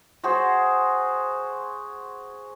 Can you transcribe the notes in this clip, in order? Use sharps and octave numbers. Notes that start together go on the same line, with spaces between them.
F#4 G#4 C5